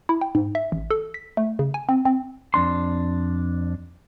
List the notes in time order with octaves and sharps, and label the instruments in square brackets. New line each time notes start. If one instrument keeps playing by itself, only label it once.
[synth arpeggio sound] E4
G5
G#2
E5
A1
A4
B6
A3
C#3
G#5
C4
C4
[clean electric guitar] F2 D4 C6